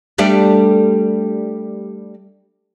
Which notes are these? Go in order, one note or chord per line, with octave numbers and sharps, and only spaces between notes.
G3 A3 D4